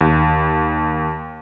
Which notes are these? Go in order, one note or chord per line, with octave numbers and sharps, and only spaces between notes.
D#2